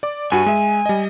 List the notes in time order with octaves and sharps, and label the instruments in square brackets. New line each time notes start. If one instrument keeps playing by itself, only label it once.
[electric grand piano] D5 D6
[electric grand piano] G2 F#4 D#7 [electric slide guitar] G#5
[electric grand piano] G#3 E5
G3 D#5